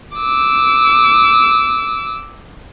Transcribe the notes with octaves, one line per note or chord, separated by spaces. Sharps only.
D6 E6